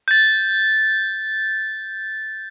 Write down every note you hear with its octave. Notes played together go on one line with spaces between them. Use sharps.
G6 A6